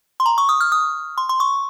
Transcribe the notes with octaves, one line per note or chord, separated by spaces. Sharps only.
C6
A#5
C#6
D#6
F6
D#6
C6
C6
C#6